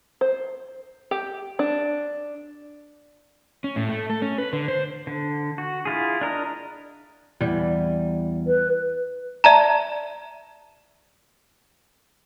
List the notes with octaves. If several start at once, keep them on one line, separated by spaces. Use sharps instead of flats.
C5
G4
D4
C#4
A2
A3
A4
C#4
B4
D3
C5
D3
F#4
E4 F4 G#4
D4 A#4 D#5
E2 G3
B4
D5 E5 A5 A#5